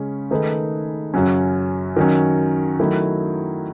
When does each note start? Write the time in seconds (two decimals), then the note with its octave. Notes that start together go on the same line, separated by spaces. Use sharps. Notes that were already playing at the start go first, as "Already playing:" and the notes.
Already playing: C#3 G#3 C#4
0.31 D#3 A3 D#4 G#4 B4
1.14 F#2 C#3 F#3 C#4
1.96 D#3 F#3 C#4
2.79 D#3 F#3 A3 E4